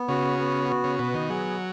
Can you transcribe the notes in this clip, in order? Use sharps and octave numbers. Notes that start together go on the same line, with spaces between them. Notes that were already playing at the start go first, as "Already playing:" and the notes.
Already playing: B3
C#3 F#4
B3
F#4
C#3
B2 B3
D#3
F#3 G#4